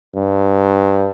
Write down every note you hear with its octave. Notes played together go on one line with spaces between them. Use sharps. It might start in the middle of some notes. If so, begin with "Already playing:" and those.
G2